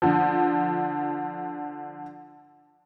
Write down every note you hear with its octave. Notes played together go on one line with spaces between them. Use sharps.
D3 F3